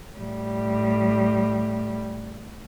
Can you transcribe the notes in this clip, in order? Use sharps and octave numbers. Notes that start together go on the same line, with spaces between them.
A2 G3